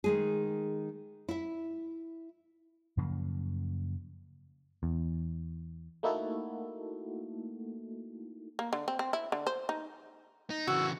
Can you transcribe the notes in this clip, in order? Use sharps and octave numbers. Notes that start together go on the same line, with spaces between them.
D#3 G#3 G#4
E4 E5
F#2 C#3 F3 A#3
E2
A3 A#3 D#4 E4 F#4 A4
A#3
D3
C4
C4
E4
D3
C5
D#4
D#4
C#3 E3 F#4 E6